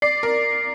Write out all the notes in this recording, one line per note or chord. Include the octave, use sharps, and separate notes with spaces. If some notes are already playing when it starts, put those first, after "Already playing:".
D5 C7
A#4